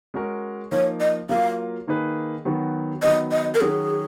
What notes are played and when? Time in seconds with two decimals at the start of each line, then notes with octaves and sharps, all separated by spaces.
0.14 G#3 C#4 F#4 A#4
0.72 F3 A#3 D#4 C#5
1.00 D#5
1.29 F#3 A#3 F4 A#4 F5
1.87 D#3 A#3 D#4 G#4 B4
2.45 D#3 F#3 B3 F#4
3.02 D#3 F#3 B3 D#5
3.32 D#5
3.55 A#4
3.61 D#3 F#3 C#4 F#4 G#4